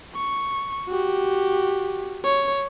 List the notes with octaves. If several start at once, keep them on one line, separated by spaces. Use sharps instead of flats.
C#6
F#4 G4
C#5